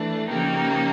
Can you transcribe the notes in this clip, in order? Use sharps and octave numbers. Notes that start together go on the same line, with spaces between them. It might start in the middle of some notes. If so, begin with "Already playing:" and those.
Already playing: E3 A3 D4
C#3 F3 A#3 D#4 G4